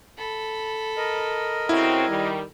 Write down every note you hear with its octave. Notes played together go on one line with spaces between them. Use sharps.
A4 B5
A#4 D#5
C#3 C4 E4 F#4
D#3 G3